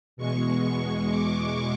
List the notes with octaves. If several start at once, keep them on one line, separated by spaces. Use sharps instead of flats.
E2 B2 G#3 C#6
C#6
D6